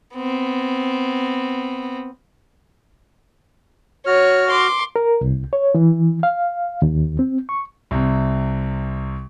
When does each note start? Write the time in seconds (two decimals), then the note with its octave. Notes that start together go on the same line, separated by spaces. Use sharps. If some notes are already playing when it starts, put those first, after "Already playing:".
0.15 B3 C4
4.07 F#4 C#5 F6
4.50 C6 D6
4.96 A#4
5.21 C2
5.53 C#5
5.75 E3
6.23 F5
6.82 D#2
7.19 C4
7.49 C#6
7.91 C2 C3